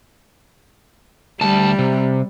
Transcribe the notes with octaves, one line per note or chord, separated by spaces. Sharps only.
D2 G3 A5
C3